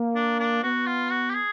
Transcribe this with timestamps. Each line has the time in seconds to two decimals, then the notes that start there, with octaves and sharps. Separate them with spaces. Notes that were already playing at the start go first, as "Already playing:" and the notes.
Already playing: A#3
0.16 D4
0.40 D4
0.63 B3 F#4
0.86 F4
1.11 F#4
1.30 G4
1.35 G#4